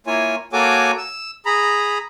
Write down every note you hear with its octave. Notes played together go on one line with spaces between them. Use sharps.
A#3 E4 F4 C#5 G#5
A#3 F#4 A4 C#5 G#5 D6
E6
G#4 A#5 B5